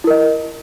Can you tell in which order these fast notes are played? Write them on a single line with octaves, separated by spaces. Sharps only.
E4 A#4 D#5